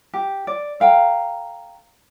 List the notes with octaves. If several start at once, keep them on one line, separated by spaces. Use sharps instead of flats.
G4
D5
A4 F5 G5 A#5